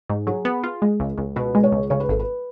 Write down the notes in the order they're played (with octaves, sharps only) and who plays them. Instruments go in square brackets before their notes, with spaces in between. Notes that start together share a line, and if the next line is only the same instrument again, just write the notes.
[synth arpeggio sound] G#2
[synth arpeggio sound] F#3 [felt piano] G#4
[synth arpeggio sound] B3
F4
G#3
C#2
C#2
[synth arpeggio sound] B2 [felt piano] B4
[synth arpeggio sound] G#3
[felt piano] C#5
[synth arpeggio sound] C#2
[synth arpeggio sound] C#3 [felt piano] C#5
[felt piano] B4
[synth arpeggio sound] G#1 [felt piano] A4
[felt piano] B4